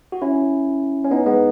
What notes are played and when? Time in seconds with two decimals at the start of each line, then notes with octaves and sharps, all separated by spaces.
0.12 F#4
0.22 C#4 E4
1.04 C#4
1.11 B3 D#4
1.26 G#3 B3